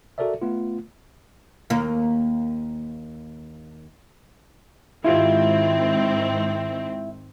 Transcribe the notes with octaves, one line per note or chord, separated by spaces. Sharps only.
F#4 A4 A#4 D5 E5
A3 B3 F4
D#2 A#3
G#2 D#3 C4 E4 F4 G4